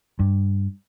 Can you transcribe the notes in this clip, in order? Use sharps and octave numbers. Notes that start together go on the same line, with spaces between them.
G2